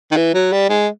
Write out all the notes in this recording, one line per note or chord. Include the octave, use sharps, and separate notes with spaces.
D#3
E3
F#3
G3
G#3